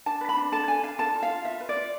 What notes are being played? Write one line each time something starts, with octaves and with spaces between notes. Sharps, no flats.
D4 A5
B4
B5
D4
A4 A5
D4 G#5
D4 F5
A4 A5
F4
F5
F4
F4 E5
B4
D5
F4